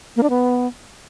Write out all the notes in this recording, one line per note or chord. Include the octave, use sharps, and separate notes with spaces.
A#3
D4
B3